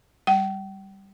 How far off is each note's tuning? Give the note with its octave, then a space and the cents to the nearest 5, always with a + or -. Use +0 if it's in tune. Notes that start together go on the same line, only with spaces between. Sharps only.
G3 +0 G5 -35